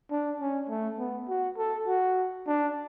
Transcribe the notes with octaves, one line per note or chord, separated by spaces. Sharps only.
D4
C#4
A3
B3
F#4
A4
F#4
D4